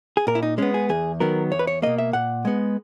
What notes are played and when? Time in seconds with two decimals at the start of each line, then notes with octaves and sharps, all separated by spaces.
0.17 G#4
0.27 A#2 A#4
0.35 E4
0.43 D#4
0.58 G#3 B3 C#4
0.74 G#4
0.89 E2 G#4
1.20 D#3 F#3 B3 A#4
1.52 E2 C#5
1.59 B4
1.67 C#5
1.82 B2 A#3 D#5
1.98 E5
2.13 A#2 F#5
2.45 G#3 B3